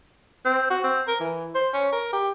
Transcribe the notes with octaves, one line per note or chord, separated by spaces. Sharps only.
C4
F#4
C4
A#4
E3
C5
C#4
A#4
G4